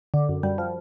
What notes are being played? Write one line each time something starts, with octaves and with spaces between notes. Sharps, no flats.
D3
F#2
F#2 G3
F3